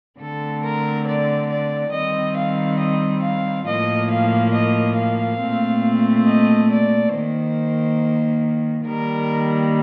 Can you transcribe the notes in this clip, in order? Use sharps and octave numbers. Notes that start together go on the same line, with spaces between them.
D3 A3 C4 A4
A#4
D5
D5
D#3 G3 C4 D#5
F5
D#5
F5
A2 F3 A#3 D#5
F5
D#5
F5
A#2 A3 C4
D#5
D5
D#3 A#3 C5
D#3 G3 A#3 A#4